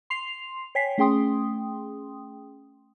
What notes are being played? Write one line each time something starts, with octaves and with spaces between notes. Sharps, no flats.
C6 C7 F7
C#5 G5 G#5 B6 C7
A3 C#4 G#4 G5 C6 D#6